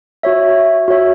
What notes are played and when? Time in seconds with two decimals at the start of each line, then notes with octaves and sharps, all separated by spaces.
0.23 F#4 C#5 E5
0.88 F#4 C#5 E5